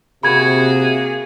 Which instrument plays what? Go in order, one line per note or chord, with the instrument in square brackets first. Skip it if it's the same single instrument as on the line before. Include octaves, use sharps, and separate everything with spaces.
[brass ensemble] C3 [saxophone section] A#3 G#4 [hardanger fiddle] F#4 [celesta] B5 G#6